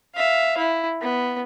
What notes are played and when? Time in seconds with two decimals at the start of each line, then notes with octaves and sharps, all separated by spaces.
0.15 E5 F5
0.58 E4
1.01 B3